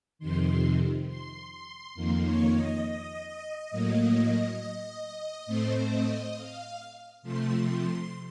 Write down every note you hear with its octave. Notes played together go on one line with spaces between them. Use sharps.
F2 C3 D#3 C6
C6
C6
F2 D#3 A#3 C6
C#5
D#5
D#5
A2 F#3 A#3
A2 A3 C4 C5
D#5
F5
C3 F3 A3 C6
C6